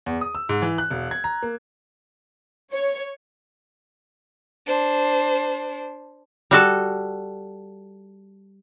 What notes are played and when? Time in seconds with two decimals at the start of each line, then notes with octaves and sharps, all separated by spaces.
0.06 E2
0.21 D#6
0.35 E6
0.49 G#2
0.62 E3
0.78 F#6
0.90 E1
1.11 G#6
1.24 A#5
1.42 A#3
2.72 C#5
4.67 D4 C5
6.51 G3 F#4 A4